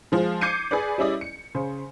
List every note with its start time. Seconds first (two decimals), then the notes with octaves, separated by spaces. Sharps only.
0.12 F3 G#3
0.41 D6 G6 G#6 C7 C#7 D#7
0.71 G#4 B4 D5
0.98 G3 C#4 E4 D5 D#5
1.21 C#7
1.55 C#3 C5